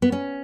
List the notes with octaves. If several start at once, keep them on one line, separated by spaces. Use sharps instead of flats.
B3
C#4